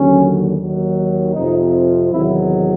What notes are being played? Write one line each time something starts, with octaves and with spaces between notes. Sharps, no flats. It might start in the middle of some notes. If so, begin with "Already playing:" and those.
Already playing: D#2 D3 F#3 C#4
D#2 D#3 F#3
F2 C3 F3 D#4
E2 C3 D#3 F#3 E4